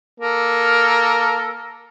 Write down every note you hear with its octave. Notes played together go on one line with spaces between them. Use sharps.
A#3 A4 A#4